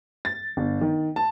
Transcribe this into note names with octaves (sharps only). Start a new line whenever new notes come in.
A6
G1
D#3
A5